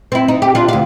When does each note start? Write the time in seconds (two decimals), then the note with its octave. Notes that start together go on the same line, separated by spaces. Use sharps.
0.12 C4 E4
0.28 D#4
0.42 G4
0.55 D4 F4
0.68 D2 F5